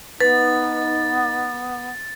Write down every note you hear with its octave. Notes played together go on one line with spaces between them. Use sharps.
B3 D#4 B4 A6